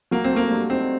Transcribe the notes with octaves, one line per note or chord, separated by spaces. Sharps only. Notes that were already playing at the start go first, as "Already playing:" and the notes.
F#3 A#3
C4
A3 A#3
G2
C4 D#4